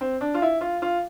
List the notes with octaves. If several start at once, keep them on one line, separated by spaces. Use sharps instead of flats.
C4
D4
F4
E4
F4
F4